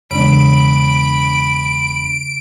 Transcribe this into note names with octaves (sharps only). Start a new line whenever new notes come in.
E1 C#3 D4 B5 D7